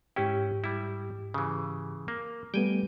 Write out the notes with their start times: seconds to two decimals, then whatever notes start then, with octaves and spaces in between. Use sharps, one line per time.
0.16 G#2 C#4 E4 G4 G5
0.64 G3 E4
1.34 C#3 E3
2.08 A#3
2.54 G3 A3 B3 G5 G#5